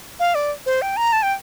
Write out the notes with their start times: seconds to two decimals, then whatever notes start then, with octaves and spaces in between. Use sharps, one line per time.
0.20 F5
0.35 D5
0.66 C5
0.82 G5
0.97 A#5
1.13 A5
1.23 G5